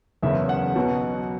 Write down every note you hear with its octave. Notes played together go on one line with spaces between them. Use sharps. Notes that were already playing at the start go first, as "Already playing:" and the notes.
F#1 E2 C#3 E5
F#5
B1 B2 F#3